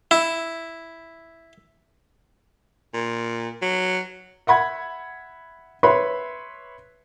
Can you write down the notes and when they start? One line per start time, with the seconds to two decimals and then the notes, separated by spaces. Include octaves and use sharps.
0.11 E4
2.94 A#2
3.62 F#3
4.47 E5 F#5 B5 G#6
5.83 B4 C#5 E5 B5 C6